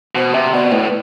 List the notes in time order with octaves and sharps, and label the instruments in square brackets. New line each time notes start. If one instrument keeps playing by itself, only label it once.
[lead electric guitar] B2 [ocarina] C5
[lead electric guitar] C3 [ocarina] E5
[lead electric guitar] B2 [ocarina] D5
[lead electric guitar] A2 [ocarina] B4